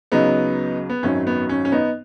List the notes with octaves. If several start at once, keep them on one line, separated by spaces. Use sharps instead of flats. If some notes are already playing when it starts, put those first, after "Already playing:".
C#2 C#3 F#3 B3 D#4
B3
G#1 F#2 D#3 F#3 C#4
B3
C#4
C#4
B3 D#4